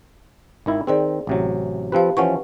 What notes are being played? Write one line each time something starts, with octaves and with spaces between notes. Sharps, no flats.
G#1 D#3 E4
D#3 C4 G#4 C5 D5
A1 C3 F#3
F3 C4 G4 B4 F5
E3 F3 C#4 B4 F#5 C#6